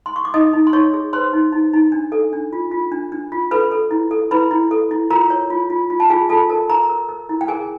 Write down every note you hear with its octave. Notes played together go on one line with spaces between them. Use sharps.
C6
C#6
D6
D#4 D#5 D#6
D#4
C6
D#4 C#5 C#6
G#4
B4 C5 C6
D#4
D#4
D#4
D4
A4
D4
F4
F4
D4
D4
F4
A4 B4 B5
A4
E4
A4
E4 B4 B5
E4
A4
E4
F4 A#4 A#5
C#5
F4
F4
F4
A5
F4 G#4 G#5
F4 A4 A5
A4 A#4 A5
A#4 A#5
A#4
A#4
E4
G5
G#4 A#4 G#5